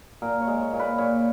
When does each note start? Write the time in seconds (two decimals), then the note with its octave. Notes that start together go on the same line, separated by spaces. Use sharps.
0.22 A#2 A#4
0.41 C#5
0.48 G#3
0.61 C#5
0.73 A#2
0.80 B4
0.98 A#2 C#5